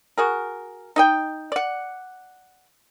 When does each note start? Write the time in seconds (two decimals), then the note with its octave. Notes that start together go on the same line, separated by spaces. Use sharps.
0.18 F#4 G#4 A#4
0.96 D#4 D#5 G5
1.52 D5 F#5